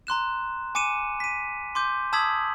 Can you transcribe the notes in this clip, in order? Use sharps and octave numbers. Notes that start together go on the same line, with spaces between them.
A#5 C6 F#6 E7
G#5 D6 C#7 D#7 E7
B6 D#7
C6 D6 G6
A5 D#6 E6 G#6 B6 F#7